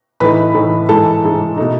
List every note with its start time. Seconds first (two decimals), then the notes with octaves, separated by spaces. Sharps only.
0.20 A2 E3 A3 D#4 B4 B5
0.54 A2 E3 A3 D#4
0.89 G#2 E3 G#3 A4 A5
1.24 G#2 E3 G#3
1.57 B2 A3 D#4